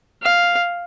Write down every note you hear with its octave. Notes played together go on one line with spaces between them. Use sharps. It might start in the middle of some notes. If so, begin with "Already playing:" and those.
F5